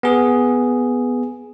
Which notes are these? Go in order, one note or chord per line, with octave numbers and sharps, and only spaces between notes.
B3 G#4